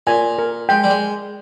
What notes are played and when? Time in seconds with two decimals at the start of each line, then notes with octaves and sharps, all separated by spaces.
0.07 A#2 G#5
0.38 A#4
0.69 G#3 G5
0.84 G3
0.90 G#3